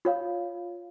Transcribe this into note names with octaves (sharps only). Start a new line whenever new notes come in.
F4 C#5 F5